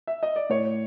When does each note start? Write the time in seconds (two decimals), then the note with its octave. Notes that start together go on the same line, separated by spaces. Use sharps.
0.07 E5
0.23 D#5
0.36 D5
0.50 A2 C#5